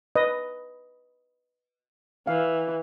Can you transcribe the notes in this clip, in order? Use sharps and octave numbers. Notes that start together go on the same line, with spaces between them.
B4 D#5
E3 F5